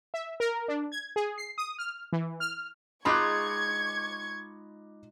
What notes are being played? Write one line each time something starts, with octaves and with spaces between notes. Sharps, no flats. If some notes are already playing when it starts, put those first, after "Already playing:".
E5
A#4
D4
G#6
G#4
C7
D#6
F6
E3
F6
G#3 D#4 F4 B5 C#6 D6 F#6 G#6